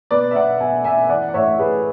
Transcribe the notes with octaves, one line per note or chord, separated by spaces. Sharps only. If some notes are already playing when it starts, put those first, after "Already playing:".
B2 B4 D5
E5
B2 D5 F#5
B2 E5 G#5
B2 E5 G#5
E3 D5 F#5
F#5
A2 C#5 E5
A2 G#4 B4